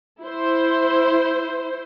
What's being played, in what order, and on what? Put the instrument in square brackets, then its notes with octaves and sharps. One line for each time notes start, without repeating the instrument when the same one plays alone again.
[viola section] E4 C5